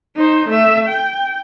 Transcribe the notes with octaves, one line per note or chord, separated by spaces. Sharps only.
D#4 C5
A3 E5
G5